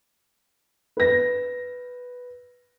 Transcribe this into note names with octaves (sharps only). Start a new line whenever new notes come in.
B4 A#6